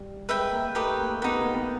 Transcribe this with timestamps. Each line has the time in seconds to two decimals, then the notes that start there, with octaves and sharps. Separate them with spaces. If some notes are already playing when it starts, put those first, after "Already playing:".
Already playing: G3
0.29 G#3 B4 E5 G5
0.52 A#3
0.75 A3 D#4 G4 B4
0.99 A#3
1.22 B3 D#4 G4 B4
1.39 A#3
1.54 B3